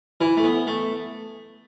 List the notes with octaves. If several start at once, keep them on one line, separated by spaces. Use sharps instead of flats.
E3 E4
A3
B3
A3